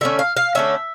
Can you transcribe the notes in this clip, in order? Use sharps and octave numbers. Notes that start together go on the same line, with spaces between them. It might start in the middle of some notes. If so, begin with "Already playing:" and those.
D3 A3 C#4 E5
F5
F5
D3 A3 C#4 E5